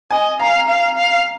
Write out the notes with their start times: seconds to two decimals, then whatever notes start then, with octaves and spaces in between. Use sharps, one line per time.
0.11 D#5 G#5
0.40 F5 A#5
0.69 F5
0.97 F5